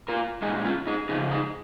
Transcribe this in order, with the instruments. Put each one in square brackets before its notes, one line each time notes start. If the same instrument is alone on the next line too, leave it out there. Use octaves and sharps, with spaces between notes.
[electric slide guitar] F4 A#4
A#2 G#3 D#4 G#4
C#4 F4
D#4 G#4
C#3 F3 D#4 G#4
D#4 G#4